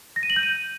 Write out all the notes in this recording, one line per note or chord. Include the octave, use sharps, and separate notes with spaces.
A#6
D#7
F#7
G6
D#7